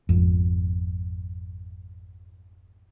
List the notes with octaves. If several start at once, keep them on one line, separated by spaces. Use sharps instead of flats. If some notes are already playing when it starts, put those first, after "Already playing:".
G#1 F2